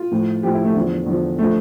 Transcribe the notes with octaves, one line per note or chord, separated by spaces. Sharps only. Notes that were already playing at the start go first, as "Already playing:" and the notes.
Already playing: F4
A2 F3
A2 F3 G4
E4
A3
E2 D3 F3
E2 D3 F3
D3 F3 A3